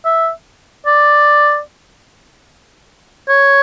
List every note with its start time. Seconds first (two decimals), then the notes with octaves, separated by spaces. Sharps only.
0.05 E5
0.86 D5
3.29 C#5